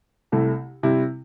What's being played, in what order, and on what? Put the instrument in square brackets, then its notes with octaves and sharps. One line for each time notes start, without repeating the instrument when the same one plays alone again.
[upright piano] C2 C3 A3 E4
C3 G3 C4 E4